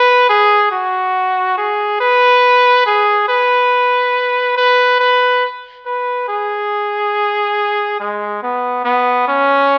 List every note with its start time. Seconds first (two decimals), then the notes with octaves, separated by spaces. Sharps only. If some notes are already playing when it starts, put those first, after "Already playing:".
Already playing: B4
0.29 G#4
0.71 F#4
1.58 G#4
2.01 B4
2.86 G#4
3.29 B4
4.57 B4
5.00 B4
5.86 B4
6.28 G#4
8.00 G#3
8.43 B3
8.85 B3
9.28 C#4